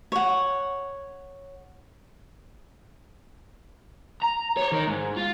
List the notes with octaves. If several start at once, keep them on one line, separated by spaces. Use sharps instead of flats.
C#5 F#5
A#5
C5 C#5
D#3 A#4
G#2
F4